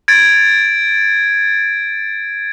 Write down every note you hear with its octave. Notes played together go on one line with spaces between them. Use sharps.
G#6 A6 D7